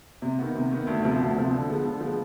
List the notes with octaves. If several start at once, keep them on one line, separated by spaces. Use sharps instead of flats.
C3
D#3 B3
C3
D#3 B3
D2
C3 F3 B3
D2
C3 F3 B3
D3
F3 G#3 B3
D3
F3 G#3 B3